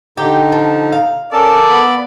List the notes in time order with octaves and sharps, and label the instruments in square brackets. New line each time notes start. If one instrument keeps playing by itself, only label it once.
[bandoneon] D3 D#4 [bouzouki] G4
[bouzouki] F3
F5
[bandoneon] C#4 [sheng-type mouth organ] A4 A#4 A5 [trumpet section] D5
[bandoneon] B3 B5